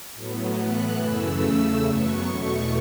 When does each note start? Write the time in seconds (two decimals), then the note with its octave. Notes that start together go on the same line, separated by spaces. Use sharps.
0.14 A2 F#3 B3
0.56 A2 E3 B3 F#6
0.98 F#2 C#3 E3 A3 E6
1.41 E2 C#3 A3
1.83 F#2 F#3 B3 C#6
2.26 E2 B2 A3 C#6